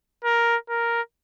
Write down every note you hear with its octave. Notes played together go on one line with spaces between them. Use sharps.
A#4
A#4